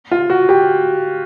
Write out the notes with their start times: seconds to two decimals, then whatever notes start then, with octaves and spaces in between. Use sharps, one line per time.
0.11 F4
0.30 F#4
0.49 G4